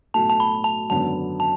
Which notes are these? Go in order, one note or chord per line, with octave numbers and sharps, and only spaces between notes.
B1 A2 F#3 A3 A5
A5
B5
A5
G#1 F#2 D3 F#3 B3 A5
A5